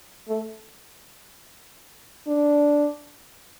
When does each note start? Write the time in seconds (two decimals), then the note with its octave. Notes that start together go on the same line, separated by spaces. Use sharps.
0.28 A3
2.27 D4